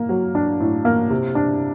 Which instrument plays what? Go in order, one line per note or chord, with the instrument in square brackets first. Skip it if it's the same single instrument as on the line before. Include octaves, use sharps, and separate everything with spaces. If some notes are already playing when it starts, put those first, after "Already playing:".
Already playing: [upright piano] A#3
F#3
D4
A2
A#3
C3
D4